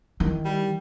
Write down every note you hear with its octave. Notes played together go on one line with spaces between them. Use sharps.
D#3 E3
G3